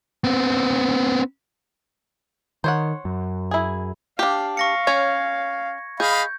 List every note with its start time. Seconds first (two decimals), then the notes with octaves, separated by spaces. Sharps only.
0.24 B3 C4
2.64 D#3 C5 C#5 F#5
3.05 F#2
3.51 E4 G#4
4.19 D4 G4 F5
4.57 F5 C#6 A#6 C#7
4.87 C#4 C#5 G#5 G#6
6.00 G#4 D#5 F5 B5 G6